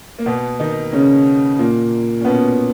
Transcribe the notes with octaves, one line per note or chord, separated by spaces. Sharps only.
A#3
B2 B3
D#3 D#4
C#3 C#4
A#2 A#3
C#4
B2 B3